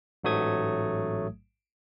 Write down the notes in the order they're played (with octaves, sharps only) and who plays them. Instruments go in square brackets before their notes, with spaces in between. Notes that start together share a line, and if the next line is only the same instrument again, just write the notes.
[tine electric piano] A1 G#2 F#3 A3 D#6 G#6